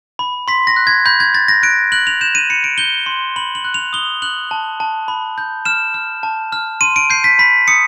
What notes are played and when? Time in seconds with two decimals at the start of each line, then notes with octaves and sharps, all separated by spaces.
0.19 B5
0.48 C6 B6
0.67 A#6
0.76 F#6
0.87 G#6
1.06 B5 G6
1.20 G#6
1.34 B5 A6
1.48 A#6
1.63 F#6 D7
1.92 F#6 F#7
2.07 F7
2.21 G6 E7
2.35 D#7
2.50 B5 C#7
2.64 D7
2.78 G6 G7
3.06 C6
3.36 B5 F#7
3.55 F#7
3.64 F#6
3.74 F7
3.93 D#6 G7
4.22 F#6 F#7
4.51 A5
4.80 A5
5.08 B5
5.38 G6
5.65 F6 E7
5.94 F6
6.23 A5
6.52 F6
6.81 C6 D#7
6.96 D7
7.10 G6 C7
7.24 B6
7.39 B5 B6
7.68 D#6 C#7